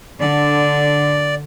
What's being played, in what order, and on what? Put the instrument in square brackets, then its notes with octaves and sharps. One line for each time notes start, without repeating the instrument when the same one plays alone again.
[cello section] D3 [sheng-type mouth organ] D5